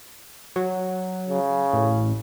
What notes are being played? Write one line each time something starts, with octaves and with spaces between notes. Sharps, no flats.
F#3
C#3
A1